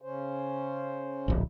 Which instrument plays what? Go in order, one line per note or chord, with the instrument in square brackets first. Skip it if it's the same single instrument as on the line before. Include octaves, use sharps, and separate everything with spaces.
[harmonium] C#3 C#4 C5
[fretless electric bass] D1 A#1